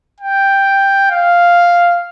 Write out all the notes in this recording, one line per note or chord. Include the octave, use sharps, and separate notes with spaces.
G5
F5